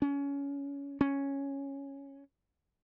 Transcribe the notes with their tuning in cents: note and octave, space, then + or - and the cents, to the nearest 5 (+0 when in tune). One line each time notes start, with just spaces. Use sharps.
C#4 +20
C#4 +0